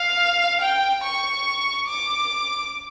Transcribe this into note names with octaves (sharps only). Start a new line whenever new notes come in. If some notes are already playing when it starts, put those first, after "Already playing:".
Already playing: F5
G5
C#6
D6